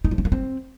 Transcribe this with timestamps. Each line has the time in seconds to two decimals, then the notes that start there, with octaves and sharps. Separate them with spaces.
0.04 D#4
0.11 F3
0.18 C#4
0.25 A#3
0.32 C4